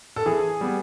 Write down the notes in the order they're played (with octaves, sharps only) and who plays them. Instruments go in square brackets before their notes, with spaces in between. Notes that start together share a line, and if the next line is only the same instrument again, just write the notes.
[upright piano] A4
[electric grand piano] E3 [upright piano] G#4
[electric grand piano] G3 B3